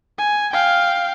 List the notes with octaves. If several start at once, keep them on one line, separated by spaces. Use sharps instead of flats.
G#5
F5 G5